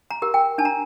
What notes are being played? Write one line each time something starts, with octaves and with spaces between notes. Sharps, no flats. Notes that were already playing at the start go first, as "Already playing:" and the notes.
A#5
G4 A#4
G5
D4 A5
A#5